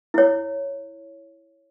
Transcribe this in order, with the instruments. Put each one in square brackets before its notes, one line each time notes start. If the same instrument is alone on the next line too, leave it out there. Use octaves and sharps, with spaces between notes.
[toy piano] E4 C#5